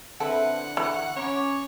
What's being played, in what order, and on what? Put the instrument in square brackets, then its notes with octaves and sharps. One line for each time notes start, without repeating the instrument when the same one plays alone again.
[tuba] D3 [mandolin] C4 E4 B4 [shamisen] A4 [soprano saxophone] F#5
[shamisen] E3 [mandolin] C#6
[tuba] C#4 [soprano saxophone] C#5 [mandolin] A#5 B5 D6